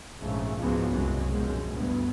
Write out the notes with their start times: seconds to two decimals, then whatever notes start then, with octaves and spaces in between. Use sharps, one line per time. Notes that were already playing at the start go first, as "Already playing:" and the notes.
0.20 A#1 G#2 C#3 A3
0.59 C#2 G#2 F3 F#3 G#3 B3
0.90 C2 F#2 C#3 F#3 G#3
1.29 A#1 F#2 B2 G#3
1.73 D2 G2 B3